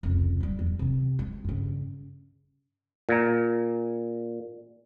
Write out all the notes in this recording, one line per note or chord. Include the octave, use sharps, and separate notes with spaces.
F1 C#2
F#3 G3
E2
C3 D#3
G#3
G2 C#3
A#2 A#5